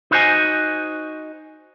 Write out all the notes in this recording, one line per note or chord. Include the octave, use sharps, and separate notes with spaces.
D#4 E4 F#4 C5 D#5 G#5